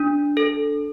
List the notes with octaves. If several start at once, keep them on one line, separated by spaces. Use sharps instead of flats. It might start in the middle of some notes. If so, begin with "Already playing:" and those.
Already playing: D4
A4